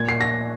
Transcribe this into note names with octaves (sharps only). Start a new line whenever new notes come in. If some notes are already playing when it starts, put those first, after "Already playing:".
Already playing: A#2 G#6
C7
A#6